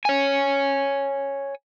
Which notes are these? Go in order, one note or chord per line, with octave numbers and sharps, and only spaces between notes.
C#5 G#5